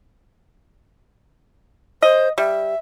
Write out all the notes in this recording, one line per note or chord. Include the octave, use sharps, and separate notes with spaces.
C5 D#5
G3 E5